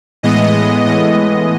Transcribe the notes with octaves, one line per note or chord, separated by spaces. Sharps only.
A2 E3 G#3 B3 D#5
A2 E3 G#3 B3 D#5